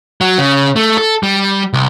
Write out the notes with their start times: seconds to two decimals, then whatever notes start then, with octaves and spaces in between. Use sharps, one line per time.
0.21 F#3
0.38 C#3
0.76 A3
0.98 A4
1.23 G3
1.73 C2